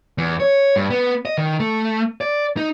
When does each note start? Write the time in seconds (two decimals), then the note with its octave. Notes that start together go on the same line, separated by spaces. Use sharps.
0.18 E2
0.40 C#5
0.76 G2
0.90 B3
1.25 D#5
1.38 D#3
1.60 A3
2.21 D5
2.57 D#4